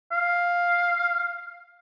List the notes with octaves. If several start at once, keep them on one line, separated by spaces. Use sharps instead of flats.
F5